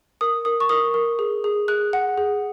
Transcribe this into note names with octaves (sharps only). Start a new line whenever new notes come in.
A#4 D#6
A#4 D#6
C#6
A#4 D#6
A#4
G#4
G#4
G#4 F#6
F#5
G#4